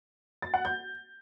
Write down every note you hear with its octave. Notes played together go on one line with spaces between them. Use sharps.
A6
F#5
G6